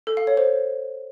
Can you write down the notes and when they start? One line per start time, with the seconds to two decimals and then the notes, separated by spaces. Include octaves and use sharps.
0.07 A4
0.17 F5
0.27 C#5
0.37 C5